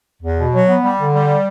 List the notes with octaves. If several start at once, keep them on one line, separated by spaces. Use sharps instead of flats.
E2
B2
F#3
B3
G3
D3
G3